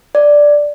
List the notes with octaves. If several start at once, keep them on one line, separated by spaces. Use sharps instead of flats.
D5